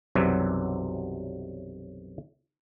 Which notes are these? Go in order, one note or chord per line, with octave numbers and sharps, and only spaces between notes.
B1 F#2 C3 E3 F#3 G3